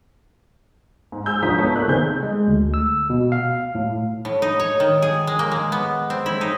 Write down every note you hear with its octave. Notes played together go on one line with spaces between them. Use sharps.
G#2
G#4 E6 G6
G#1 F3 D4 A#5 D#6 B6
A3 B3 C#5 A5
A3 A#3 D5 E6 F#6
C3 D#3 B3 G#4 C5 G6
G#3
D2
E6
B2
F5
A2
A2
D#4
C#5
D#3
G#4
G#3
A#3
G#3
B3
C4
E4
D#4